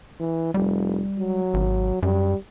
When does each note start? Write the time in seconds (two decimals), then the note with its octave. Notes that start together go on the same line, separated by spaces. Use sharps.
0.20 E3
0.54 F1 G3
1.19 F#3
1.54 G#1
2.03 F#2 G3